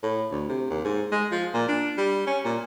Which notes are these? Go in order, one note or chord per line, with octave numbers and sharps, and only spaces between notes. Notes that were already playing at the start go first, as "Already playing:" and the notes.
A2
D2
C3
D#2
G#2
G#3
F3
A#2
D4
G3
C#4
A#2